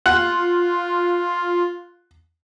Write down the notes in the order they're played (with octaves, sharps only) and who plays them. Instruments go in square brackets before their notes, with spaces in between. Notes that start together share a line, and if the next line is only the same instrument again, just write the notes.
[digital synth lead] F4 [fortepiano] F#5